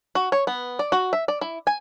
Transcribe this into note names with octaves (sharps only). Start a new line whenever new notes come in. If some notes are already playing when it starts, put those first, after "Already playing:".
F#4
C#5
B3
D5
F#4
E5
D5
E4
G#5